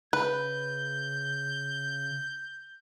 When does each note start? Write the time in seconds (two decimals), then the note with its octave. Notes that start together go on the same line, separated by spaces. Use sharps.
0.13 C#3 B4 G6